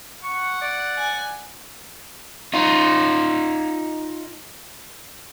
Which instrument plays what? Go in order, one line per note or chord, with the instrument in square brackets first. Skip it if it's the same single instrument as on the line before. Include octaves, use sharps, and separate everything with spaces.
[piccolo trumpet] F#5 [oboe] C#6
[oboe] D5
[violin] G#5
[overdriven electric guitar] D#4 F4